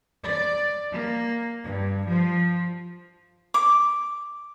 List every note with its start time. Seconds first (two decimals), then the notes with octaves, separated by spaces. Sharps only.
0.23 D5
0.90 A#3
1.65 G2
2.09 F3
3.54 D6